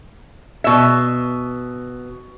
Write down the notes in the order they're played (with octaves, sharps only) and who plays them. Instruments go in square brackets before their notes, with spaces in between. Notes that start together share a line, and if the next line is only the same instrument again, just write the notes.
[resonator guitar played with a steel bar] B2 E5